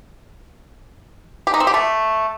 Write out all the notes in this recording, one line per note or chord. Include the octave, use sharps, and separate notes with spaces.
G4
D#4
C4
G4
A3